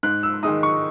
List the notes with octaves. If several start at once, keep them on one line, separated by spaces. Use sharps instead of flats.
G#2 F#6
E6
D#3 G#3 D#4 D#6
C#6